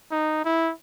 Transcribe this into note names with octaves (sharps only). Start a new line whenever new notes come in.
D#4
E4